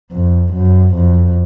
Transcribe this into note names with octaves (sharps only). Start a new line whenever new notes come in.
F2
F#2
F2